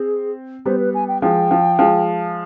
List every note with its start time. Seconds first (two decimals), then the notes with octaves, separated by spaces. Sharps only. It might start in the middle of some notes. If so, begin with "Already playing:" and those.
Already playing: C4 G#4
0.66 G3 B3 C5
0.80 B4
0.94 G#5
1.08 G5
1.22 F3 G#3 G5
1.51 F3
1.79 F3 G#3